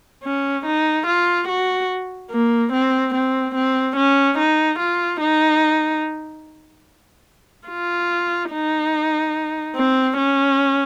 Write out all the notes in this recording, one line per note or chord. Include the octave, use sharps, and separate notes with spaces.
C#4
D#4
F4
F#4
A#3
C4
C4
C4
C#4
D#4
F4
D#4
F4
D#4
C4
C#4